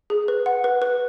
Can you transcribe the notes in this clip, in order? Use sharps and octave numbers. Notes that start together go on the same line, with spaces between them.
G#4
B4
F#5
B4
B4